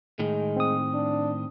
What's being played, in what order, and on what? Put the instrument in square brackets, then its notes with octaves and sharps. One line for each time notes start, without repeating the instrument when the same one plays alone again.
[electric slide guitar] A2 D#3 [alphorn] G#3
[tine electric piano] C4 D#6
[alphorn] D4